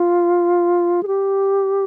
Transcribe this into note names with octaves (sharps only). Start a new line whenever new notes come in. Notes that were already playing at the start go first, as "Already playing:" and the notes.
Already playing: F4
G#4
G4